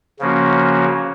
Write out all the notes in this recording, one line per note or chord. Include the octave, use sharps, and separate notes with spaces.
C#3 F3 A#3 C#4 F#4